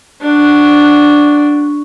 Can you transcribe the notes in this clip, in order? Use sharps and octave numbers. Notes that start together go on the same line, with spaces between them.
D4 F#4